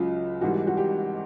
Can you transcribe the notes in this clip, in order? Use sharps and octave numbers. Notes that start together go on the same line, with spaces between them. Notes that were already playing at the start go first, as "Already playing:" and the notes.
Already playing: C#2 C#3 F#3 F4
G#1 G#2 E3 G3 F#4
F#4
G4